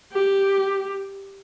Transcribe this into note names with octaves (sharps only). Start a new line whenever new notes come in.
G4